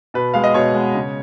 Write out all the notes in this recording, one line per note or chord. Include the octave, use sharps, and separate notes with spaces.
B2 B4
G#3 B3 F5
D#5
B2 C#5
G#3 B3
C#3